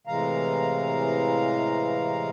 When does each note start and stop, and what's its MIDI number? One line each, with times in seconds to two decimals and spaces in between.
0.07 2.30 45
0.07 2.30 48
0.07 2.30 52
0.07 2.30 56
0.07 2.30 77
0.07 2.30 82